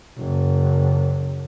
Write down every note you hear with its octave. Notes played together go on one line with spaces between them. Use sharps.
F#1